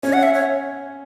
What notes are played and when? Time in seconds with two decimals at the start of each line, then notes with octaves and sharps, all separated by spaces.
0.03 C#4 C#5
0.13 F#5
0.23 E5
0.34 C#5